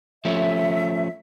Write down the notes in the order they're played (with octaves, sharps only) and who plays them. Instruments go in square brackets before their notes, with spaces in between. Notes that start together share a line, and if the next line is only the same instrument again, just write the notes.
[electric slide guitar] F3 A3 C#4 [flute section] E5